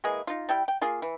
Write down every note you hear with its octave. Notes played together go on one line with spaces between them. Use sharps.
E3 G#3 A#3 G#4
D#4 F4
G3 E4 G5
G5
A#3 F4 G#4
E3